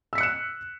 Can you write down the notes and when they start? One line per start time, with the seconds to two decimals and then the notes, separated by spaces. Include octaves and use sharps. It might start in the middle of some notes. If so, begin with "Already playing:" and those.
0.13 E6
0.15 B6
0.18 C#7
0.21 F#6
0.23 E7